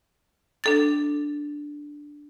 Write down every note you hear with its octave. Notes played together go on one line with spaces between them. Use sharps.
D4 A4 A6